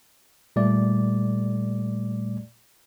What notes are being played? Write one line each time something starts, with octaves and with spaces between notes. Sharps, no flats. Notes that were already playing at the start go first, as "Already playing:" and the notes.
A#2 G3 A3 D5